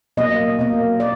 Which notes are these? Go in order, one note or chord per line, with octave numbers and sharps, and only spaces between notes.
B2 F#3 A#3 D#5
B2 F#3 A#3
D5